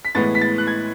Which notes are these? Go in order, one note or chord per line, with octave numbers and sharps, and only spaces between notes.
B6
A2 E3 G#3 B3 A6
B6
A6
F#6
G#6